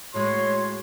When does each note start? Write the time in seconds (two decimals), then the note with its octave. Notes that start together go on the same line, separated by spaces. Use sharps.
0.14 A2 G#3 F#4 C#5 C6